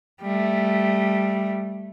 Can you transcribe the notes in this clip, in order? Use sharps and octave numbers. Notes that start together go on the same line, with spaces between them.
G3 A3